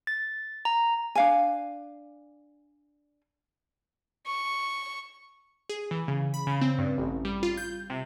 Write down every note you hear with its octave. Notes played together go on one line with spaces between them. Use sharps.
A6
A#5
D4 F5 G#5
C#6
G#4
E3
C#3
B5
C#3
C4
G2
A1
G3
F4
G6
C3